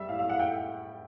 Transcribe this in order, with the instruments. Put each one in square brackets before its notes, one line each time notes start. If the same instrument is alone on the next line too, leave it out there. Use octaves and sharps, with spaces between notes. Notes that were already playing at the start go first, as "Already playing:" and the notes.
Already playing: [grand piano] G3 [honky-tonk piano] E5
[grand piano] A2 [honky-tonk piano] F5
[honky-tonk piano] F5
[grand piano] A3
[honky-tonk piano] F#5
G5